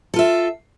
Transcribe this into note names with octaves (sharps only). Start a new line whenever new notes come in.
F4 A4 E5